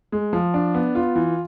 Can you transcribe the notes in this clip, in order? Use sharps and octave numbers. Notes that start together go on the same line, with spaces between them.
G#3
F3
D4
B3
F4
E3